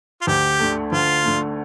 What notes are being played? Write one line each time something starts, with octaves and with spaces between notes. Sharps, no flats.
F4
D2 G4
D3 A3
D2 F4
D3 A3